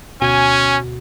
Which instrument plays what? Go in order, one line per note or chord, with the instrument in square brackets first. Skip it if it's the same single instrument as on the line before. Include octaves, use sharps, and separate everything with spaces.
[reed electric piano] D2 B2 F#4 [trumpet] C#4 [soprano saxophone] G#5